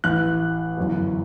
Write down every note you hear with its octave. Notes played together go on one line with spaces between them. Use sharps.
A1 A2 E3 F#6
G1 F#2 E3